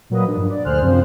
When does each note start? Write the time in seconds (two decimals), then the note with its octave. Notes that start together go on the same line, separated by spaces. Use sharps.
0.10 A#2 F#3 A#3 B4 D#5
0.24 F3 D4
0.36 G2
0.49 D5
0.64 D2 D3 G#4 C5 F6 F#6
0.81 F#2 C3 F3 C5